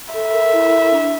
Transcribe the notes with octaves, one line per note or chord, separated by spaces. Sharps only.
A4 E5
A#4
E4
D4